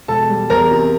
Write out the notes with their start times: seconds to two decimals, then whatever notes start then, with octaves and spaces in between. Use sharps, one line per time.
0.08 E1 A4 A5
0.30 G3
0.50 E2 A#4 A#5
0.71 C3